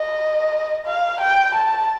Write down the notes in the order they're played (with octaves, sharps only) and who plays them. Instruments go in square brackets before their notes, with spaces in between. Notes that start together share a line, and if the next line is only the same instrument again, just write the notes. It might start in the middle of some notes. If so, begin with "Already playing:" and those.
Already playing: [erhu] D#5
F5
G5
A5